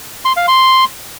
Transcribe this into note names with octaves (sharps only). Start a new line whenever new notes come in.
C6
F5
C6